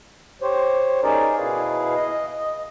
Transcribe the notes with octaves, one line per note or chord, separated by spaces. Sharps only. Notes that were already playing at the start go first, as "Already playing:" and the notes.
G4 C5 C#5
C#4 D#4 G#4 A#4 D5
B2 E4 G#4 B4 F5
D#5
D#5